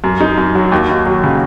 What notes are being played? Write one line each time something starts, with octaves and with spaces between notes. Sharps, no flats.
F#2
D#4
F#2
F#3
D#2
D#2
F#3
C#3